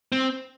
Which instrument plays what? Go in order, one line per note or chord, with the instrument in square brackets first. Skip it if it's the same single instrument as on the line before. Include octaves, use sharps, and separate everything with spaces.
[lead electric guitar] C4